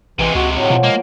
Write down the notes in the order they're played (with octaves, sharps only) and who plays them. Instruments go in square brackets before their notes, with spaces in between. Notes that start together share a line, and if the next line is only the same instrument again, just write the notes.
[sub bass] A1 [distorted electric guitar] C3 G#3 [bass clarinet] E3
[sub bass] C#2 [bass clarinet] F#4
[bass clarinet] A2 [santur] F#3
[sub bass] B2 [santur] F3
[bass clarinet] G#3 [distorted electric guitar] A#3